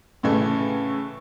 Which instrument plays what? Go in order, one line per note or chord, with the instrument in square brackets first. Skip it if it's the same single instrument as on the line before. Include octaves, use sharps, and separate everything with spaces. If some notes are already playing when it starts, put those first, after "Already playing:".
[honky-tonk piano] A2 C#3 E3 A3